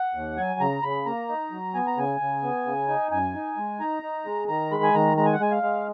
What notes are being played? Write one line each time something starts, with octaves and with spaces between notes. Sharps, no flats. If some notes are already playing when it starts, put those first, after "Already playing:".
Already playing: F#5
D#2
F#3 G#5
C#3 A#5
C#3 B5
A#3 A#5
D#4
F#3
B3 G#5
A#5
C#3 G#5
C#3
B3
C#3
D#4
F#2 G#5
D#4
G#3
D#4 A#5
D#4
G#3
D#3 A#5
G#3 B5
G#5
D#3 A#5
G#3 A#5
G#5
F#5
G#3 G#5
F5
G#3